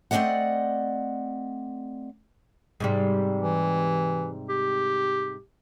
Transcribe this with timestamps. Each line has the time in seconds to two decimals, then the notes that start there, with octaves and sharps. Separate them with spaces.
0.11 A3 C4 D4 D5 D#5 F#5
2.80 G#2 C3 G3
3.40 E3
4.49 G4